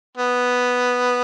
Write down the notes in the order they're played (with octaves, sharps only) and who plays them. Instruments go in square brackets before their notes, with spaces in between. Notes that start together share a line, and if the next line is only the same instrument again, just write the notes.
[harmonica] B3